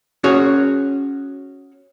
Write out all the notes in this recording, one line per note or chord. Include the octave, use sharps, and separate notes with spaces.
C#4 F#4 G#4 C#5